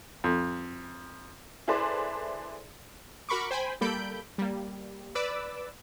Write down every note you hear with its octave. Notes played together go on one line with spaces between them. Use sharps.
F2
E4 G#4 A4 B4 C5 D5
F#4 A#4 B5 C#6 D6
C5 G5 G#5 B5
G3 A#3 A4 B5 G6 D7
G3 A#3
B4 D5 D6 E6